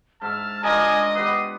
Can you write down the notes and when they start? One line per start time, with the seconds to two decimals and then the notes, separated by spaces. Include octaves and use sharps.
0.21 G#2 E5 A5 F6
0.63 D4 F4 A#4 D#5 G#5 D#6
1.15 B3 G4 B4 D#6 C7